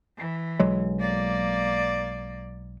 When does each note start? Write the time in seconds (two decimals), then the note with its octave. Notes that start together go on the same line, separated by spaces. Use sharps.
0.18 E3
0.60 B1 F#3 G#3
1.00 A#3 D5